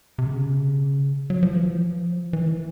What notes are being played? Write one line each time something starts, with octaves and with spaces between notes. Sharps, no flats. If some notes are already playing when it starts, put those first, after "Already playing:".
C3
C#3
F#3
F3
E3
F3
E3